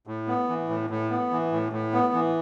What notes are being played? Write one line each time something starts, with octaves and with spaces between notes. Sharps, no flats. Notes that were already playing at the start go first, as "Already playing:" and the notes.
A2
B3
E3
A2
A2
B3
E3
A2
A2
B3
E3